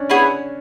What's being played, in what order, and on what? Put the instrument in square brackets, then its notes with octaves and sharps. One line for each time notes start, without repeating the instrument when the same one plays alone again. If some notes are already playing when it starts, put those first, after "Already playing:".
Already playing: [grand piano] C#4 D4
[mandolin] B3 E4 G#4 C#5